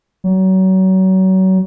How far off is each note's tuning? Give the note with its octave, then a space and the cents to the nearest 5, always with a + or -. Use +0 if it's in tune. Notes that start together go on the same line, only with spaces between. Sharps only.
F#3 +30